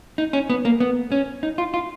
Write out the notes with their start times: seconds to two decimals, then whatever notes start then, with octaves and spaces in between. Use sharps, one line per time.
0.18 D#4
0.33 C#4
0.50 B3
0.65 A#3
0.80 B3
1.12 C#4
1.43 D#4
1.58 F4
1.74 F4